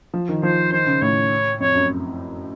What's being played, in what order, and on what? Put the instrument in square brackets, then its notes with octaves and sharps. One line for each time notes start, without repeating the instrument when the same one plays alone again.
[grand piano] F3
D#3
[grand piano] F3 [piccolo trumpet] C5
[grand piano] D#3 [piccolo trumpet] C5
[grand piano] C#3
[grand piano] A2 [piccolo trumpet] C#5
[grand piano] F2 [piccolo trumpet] C#5
[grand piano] F#2